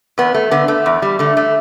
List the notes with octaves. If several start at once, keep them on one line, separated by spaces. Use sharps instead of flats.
E2 B3
A3
D3 B3
A3
E2
G3
D3 A3
A3